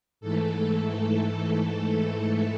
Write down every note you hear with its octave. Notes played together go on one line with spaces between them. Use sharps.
G#2 E3 A3 A4
A4